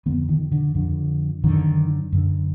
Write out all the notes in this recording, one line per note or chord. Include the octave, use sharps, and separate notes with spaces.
F2 D3 B3
D#3
D3
F2 D3
F#2 D3 D#3
F#2 D3